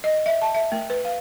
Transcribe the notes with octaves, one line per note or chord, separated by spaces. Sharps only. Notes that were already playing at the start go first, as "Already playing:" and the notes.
D#5
E5
A5
E5
A3
B4
F5